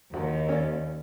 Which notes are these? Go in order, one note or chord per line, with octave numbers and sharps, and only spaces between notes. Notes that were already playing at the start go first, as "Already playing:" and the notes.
D#2 D#3 F3 F#4
C#4 D5